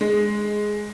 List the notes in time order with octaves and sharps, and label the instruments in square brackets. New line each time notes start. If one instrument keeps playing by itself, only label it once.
[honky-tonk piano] G#3